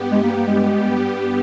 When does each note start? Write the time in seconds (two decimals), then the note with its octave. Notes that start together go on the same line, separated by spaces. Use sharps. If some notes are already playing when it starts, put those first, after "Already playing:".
Already playing: G2 G3 B3 G4
0.11 G#3
0.23 A#3
0.36 A#3
0.47 G#3